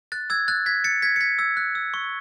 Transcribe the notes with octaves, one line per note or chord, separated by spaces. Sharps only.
F#6 A6
E6 G#6
F#6 A6
G#6 B6
A6 C#7
G#6 B6
C#7
G#6 B6
E6 G#6
F#6
E6
C#6